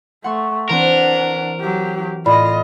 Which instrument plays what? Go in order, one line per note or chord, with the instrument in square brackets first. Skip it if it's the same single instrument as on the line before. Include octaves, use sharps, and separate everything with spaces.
[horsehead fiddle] A3 [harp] F#5 C6 C#6
[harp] E3 C4 [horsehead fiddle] D4 F#5 [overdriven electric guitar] A#4
[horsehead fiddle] F#3 G4
[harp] A2 [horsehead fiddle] F4 D#5 [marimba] D5 B5